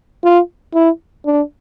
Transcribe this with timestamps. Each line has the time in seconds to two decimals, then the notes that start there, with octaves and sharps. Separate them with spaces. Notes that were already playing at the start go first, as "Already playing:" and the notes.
0.24 F4
0.74 E4
1.26 D4